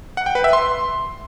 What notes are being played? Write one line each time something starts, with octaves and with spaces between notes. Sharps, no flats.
F#5
G5
B4
E5
C6